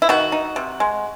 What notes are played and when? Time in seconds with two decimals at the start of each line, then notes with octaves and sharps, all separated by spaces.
0.02 E4
0.09 D#3 F#4
0.32 D#4
0.56 C3
0.80 G#3